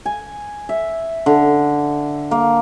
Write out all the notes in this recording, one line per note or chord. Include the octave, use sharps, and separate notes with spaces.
G#5
E5
D3
A#3